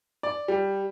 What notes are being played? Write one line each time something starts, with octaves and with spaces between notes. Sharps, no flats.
D5
G3